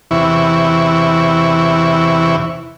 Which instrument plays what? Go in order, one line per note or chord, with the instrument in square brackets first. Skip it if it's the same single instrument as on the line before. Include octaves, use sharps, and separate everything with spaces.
[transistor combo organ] E2 C3 E3 E4 C#6